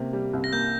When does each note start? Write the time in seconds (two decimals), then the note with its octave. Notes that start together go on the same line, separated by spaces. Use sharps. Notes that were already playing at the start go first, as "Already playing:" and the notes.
Already playing: C3 A#3
0.13 G3
0.33 C2
0.44 A#6
0.53 A#3 G6